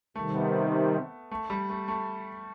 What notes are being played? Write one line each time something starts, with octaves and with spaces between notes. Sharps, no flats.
C3 D#3 G3 A3
B3
A3
G3
A3
A3